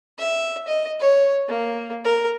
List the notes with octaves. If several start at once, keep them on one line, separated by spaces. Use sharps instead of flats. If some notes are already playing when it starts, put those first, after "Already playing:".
E5
D#5
C#5
A#3
A#4